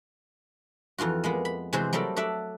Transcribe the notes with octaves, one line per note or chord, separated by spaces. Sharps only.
F2 E3 F4 F#4
G#3 A#3 B3
B5
C3 E3 G#3 F#4 C5
F#3 G3 A3 A4 A#4 D5
F#4 A4 D5 E5